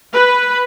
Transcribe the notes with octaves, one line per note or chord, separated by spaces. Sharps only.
B4